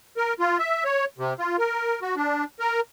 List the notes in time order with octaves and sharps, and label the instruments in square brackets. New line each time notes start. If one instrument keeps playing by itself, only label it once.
[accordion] A#4
F4
E5
C#5
C3
F4
A#4
F#4
D4
A#4